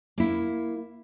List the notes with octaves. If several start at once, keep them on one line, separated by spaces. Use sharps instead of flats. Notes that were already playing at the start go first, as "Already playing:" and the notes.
A#3 E4